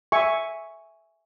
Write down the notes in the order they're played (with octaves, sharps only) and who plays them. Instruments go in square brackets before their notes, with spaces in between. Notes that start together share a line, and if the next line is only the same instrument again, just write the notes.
[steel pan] E5 G#5 C#6